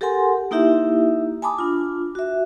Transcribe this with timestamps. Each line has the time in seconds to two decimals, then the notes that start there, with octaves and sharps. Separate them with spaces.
0.01 G4 A4 A#4 F#5 G#5 C6
0.51 A#3 D#4 E4 G4 E5
1.42 G#5 A5 B5 D6 D#6
1.59 D4 F4
2.15 F#4 E5